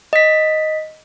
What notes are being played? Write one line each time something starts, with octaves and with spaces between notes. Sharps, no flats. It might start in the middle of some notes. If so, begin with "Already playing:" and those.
D#5 B6